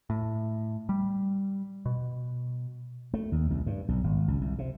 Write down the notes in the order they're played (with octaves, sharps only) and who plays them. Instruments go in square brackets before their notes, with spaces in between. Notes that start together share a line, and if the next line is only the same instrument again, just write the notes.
[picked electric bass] A2
G3
B2
[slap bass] A3
D#2
C2
G2
B1
G#1
C#2
C2
C3